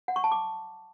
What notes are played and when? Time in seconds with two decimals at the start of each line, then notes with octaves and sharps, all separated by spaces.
0.08 F#5
0.16 C#6
0.24 A5
0.32 D6